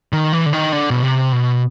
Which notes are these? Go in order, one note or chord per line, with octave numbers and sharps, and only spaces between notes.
D#3
E3
D3
D#3
D3
B2
C3
B2